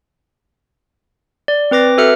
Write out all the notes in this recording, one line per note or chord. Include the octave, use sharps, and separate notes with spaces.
D5
C4 B4 D6 A#6
F#4 A4 B4 E5 F6 C#7